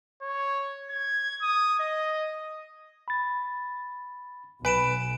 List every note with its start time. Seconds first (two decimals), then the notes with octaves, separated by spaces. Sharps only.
0.22 C#5
0.90 G#6
1.42 D#6
1.79 D#5
3.08 B5 A6
4.65 B1 B4 G#5 D7 E7